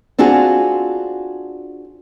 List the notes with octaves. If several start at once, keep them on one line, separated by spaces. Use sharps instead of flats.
C4 D4 F4 F#4 G#4